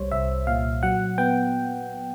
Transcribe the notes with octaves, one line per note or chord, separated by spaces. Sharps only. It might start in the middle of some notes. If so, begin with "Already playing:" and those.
Already playing: C2 G3 C5 C#5
C2 E5
A#2 F5
F#3 F#5
B3 G5